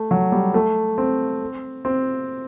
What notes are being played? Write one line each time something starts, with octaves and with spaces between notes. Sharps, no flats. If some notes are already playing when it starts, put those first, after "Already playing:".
Already playing: A3
F#3
G3
A3
C4
C4